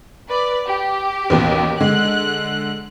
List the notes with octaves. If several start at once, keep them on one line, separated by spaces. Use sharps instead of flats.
B4 D5
G4
A1 D#2 B2
D3 G#3 F#6